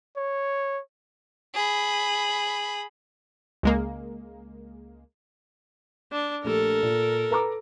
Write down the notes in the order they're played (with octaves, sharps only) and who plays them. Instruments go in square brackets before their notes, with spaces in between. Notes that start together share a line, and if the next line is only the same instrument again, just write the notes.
[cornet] C#5
[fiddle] G#4 B5
[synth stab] C#2 G#3 A#3
[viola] D4
[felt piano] A#1 A3 G4 [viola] A4 A#4
[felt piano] A#2
B4 A#5 D6